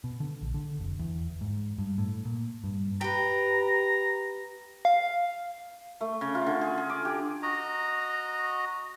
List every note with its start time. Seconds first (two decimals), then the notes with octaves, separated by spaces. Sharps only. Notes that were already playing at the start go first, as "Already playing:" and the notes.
0.04 B2
0.20 D3
0.41 A#1
0.54 D3
0.80 F1
0.99 E2
1.41 G#2
1.78 G2
1.98 A2
2.25 A#2
2.64 G2
3.01 G4 B4 A#5
4.85 F5
6.01 A3
6.21 C#3
6.35 F4
6.46 D3
6.61 G#4
6.78 G#4
6.90 D6
7.05 G4
7.43 F#4 D#5 A#5